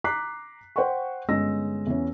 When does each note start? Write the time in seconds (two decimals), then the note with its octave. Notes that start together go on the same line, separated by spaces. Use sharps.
0.04 A#5 D6 F#6 B6 C7
0.76 C5 F#5 G5 C#6
1.29 G1 G#3 C#4 D#5 E6 A#6
1.86 E2 E3 C#4